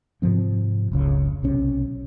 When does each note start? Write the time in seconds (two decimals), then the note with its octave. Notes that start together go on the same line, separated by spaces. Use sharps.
0.22 G#2 C3 F3 C4
0.92 F1 C#2 C#3
1.43 B1 C3 C#4